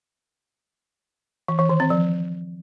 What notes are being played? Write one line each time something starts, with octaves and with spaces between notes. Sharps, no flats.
E3
E3
D#3
C4
F3